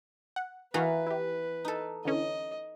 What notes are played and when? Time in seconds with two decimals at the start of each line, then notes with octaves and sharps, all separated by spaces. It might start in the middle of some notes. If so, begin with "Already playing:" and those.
0.36 F#5
0.74 E3 B3 F#4 B4 F5 A#5
1.07 E4 G4
1.65 D#4 A4
2.05 D3 E3 C#4 D#5